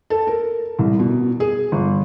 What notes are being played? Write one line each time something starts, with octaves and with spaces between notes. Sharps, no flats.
A4
A#4
C2
B2
G#4
G1